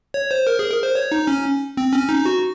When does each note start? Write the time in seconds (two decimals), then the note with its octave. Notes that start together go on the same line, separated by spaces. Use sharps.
0.14 C#5
0.31 C5
0.47 A#4
0.59 G#4
0.71 A#4
0.83 C5
0.95 C#5
1.12 D#4
1.27 C#4
1.77 C4
1.93 C#4
2.09 D#4
2.25 F#4